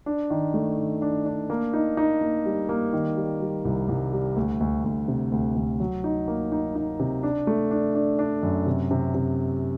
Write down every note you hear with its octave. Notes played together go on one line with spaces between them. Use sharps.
D4
D#3
A3
D#3
D4
D4
A#3
D#4
D#4
A#3
G3
A#3
D#3
G3
G3
C2
C2
G3
D2
D2
D2
C3
D2
D2
F#3
D#4
A#3
D#4
D#4
C3
D4
A3
D4
D4
D4
F#2
C3
C3
C3